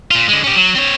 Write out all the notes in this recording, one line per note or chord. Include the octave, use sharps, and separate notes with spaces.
A#2 F4
D3 G#3
C#4 G4
F#3
C4 C#5